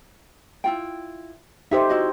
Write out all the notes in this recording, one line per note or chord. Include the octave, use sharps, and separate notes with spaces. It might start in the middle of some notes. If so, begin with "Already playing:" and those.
E4 F4 G5
D#4 G4 A4 C5 E5
E4 F#4 D#5